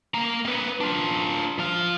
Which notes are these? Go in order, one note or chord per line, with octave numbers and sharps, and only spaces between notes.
A#3 A#5
A#3 B4
D4 F4
F3 F5